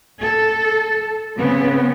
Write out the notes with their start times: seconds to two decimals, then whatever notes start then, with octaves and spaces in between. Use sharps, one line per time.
0.20 A4
1.38 C#3 B3 C4